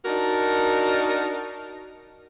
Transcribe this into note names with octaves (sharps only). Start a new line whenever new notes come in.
D4 D#4 F#4 A#4